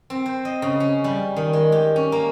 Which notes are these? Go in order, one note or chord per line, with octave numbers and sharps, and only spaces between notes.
C4
C5
D#5
C#3
C#4
G3
D#3
G#3
G4
C#4
A#3